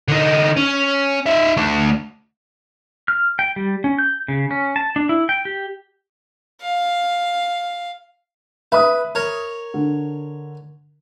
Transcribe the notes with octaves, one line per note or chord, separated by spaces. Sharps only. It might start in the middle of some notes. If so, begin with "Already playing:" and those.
D3 D#4
C#4
D#4 E5
A3 D4
F6
G5
G3
C#4
G6
C#3
C#4
A5
D4
E4
G5
G4
F5
B4 E5 B5 D#6
A#4 C#5
D3